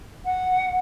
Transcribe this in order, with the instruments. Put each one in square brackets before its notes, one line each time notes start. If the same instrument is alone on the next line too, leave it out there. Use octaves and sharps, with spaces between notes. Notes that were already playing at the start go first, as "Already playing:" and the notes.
[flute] F#5